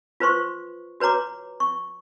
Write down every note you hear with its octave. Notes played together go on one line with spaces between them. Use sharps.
F4 B4 C5 C6 C#6
F#4 B4 C#5 A#5 D6
C#6